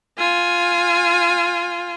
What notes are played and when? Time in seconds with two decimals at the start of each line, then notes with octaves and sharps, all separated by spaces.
0.18 F4 G#5